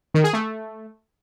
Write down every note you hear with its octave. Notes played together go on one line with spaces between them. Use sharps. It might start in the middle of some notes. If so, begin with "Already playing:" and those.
D#3
G#4
A3